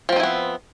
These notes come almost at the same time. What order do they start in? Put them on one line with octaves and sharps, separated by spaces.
F3 C4 D#4 E4 B3